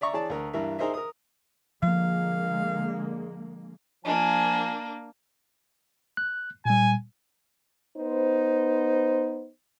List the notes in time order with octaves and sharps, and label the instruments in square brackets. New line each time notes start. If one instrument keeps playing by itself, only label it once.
[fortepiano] D5 E5 A#5 C#6
E3 G#4 C#5 D5 A5
D2 A#4
G2 E3 A#4 E5
D#4 G#4 A#4 C5 D#5 E5
A#4 D#6
[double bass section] D3 G#3 A#3 [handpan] F3 [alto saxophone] F5
[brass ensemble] F3 G#5 [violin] A#3 D4
[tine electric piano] F#6
[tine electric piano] A#2 G3 [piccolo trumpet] G#5
[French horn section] B3 D#4 B4 C5